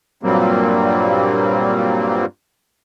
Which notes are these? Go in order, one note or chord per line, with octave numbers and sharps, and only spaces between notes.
G2 A#2 F#3 G3 A#3 C4